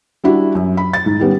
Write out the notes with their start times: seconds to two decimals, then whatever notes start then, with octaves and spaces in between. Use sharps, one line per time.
0.24 G3 D4 E4 F#4
0.55 F#2
0.77 B5
0.93 A6
1.06 G#2
1.20 D#3 G3 B3 C#4